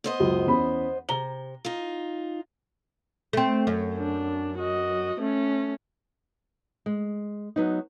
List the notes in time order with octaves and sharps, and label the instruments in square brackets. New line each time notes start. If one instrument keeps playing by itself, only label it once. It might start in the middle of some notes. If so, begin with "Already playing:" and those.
[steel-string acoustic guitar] B3 C5 D#5
[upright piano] C#2 F#2
E2 C#4 B5
[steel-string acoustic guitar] C3 [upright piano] A#5 G7
[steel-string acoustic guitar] D#4 F4
[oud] A3 C4
F#2
[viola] D4
F#4 D#5
A3 C#4
[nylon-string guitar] G#3
F#3 B3 D#4